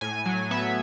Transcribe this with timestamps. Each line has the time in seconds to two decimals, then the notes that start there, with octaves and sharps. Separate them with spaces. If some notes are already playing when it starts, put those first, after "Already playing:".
0.01 A2 G#5
0.26 F#3
0.51 B3 E5